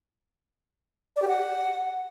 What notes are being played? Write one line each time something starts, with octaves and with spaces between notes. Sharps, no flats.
D5
G4
F#5